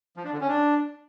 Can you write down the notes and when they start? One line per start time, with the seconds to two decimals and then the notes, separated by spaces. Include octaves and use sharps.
0.16 F3
0.25 D4
0.33 D3
0.41 C#4
0.49 D4